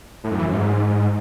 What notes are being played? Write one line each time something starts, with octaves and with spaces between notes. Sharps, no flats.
A2
F#2
E3
F#2
G#2